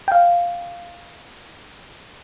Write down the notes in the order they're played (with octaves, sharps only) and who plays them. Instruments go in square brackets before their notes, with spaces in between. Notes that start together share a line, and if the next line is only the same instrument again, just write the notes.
[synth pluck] F5 G5